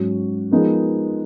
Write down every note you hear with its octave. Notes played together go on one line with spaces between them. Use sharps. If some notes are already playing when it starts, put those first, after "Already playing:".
Already playing: G#2 F#3 C#4 F#4
F3 G#3 B3 D#4 A#4